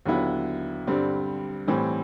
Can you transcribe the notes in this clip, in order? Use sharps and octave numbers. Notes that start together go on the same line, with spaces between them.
D#2 D3 F#3 B3 E4
G2 D3 G3 C4
A2 E3 G3 C4